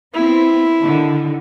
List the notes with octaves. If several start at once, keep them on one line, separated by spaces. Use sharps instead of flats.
B3 C4 E4
D3 D#3